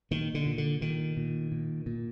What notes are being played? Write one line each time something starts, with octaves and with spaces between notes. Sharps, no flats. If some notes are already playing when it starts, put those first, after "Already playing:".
A#2 D#3
D3
A#2
D3
A#2 D#3
A#2
A#2
A#2